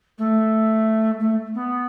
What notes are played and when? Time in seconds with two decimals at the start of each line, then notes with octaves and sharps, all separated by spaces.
0.18 A3
1.19 A3
1.54 B3